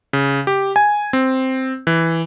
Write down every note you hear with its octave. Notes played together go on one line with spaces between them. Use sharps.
C#3
G4
G#5
C4
E3